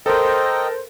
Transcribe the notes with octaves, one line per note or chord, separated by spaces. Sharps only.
A4 A#4 C5 D#5 G5 A#5